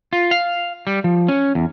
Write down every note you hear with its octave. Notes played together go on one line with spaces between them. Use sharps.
F4
F5
G3
F3
C#4
E2